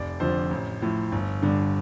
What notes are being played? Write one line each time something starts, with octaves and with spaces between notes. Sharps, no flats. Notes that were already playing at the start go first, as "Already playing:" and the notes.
Already playing: F1 D5
F2 D3 F3 C5
A1
A2 F3
G1
G2 D3